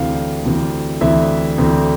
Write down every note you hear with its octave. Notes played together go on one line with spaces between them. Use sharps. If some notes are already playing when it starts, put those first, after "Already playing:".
Already playing: D2 C3 E3 F5
D2 C3 E3
D2 C3 E3 E5
D2 C3 E3